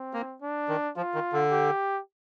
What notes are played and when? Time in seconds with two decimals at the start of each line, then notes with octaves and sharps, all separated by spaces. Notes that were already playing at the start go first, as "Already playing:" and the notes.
Already playing: C4
0.13 A#3
0.41 D4
0.68 D#3
0.96 F3 F4
1.14 D#3
1.32 D3
1.51 G4